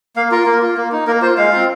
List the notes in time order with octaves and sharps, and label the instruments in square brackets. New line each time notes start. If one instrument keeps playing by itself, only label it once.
[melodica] A#3 F5
F4 A#4
A#3
F4
A#3
D#4
A#3 A#4
F4 C5
G#3 F5
C4 F4